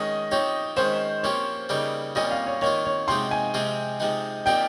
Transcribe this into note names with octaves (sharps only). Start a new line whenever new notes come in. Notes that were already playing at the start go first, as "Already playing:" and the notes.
Already playing: D#3 G#3 C#4 D#5
F3 C4 D#4 G4 C#5
D#3 G#3 C#4 C5
F3 A#3 C#4 G4 C#5
C#3 G3 A#3 D#4 G4
A#2 G3 C#4 F4 D#5
F5
C#5
D#3 A#3 F4 C#5
C#5
C3 F3 G#3 D#4 G4 C6
G#5
C3 F3 G#3 C4 F4
C3 F3 G#3 D#4
A#2 F3 C4 D#4 G4 G5